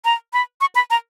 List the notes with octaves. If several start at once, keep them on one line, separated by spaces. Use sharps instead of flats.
A#5
B5
C#6
B5
A#5